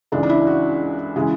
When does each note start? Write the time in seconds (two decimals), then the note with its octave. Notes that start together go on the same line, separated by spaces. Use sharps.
0.12 C#2 C#3 E3 G#3 D4
0.23 D4
0.29 E4
0.47 F#4
1.16 C#3 E3 G#3